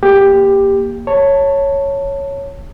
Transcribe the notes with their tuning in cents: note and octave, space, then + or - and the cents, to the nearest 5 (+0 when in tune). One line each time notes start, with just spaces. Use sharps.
A#3 +10 G4 +10
C#5 +0 A5 +20